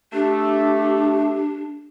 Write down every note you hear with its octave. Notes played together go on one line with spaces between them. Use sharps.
A3 D4 G4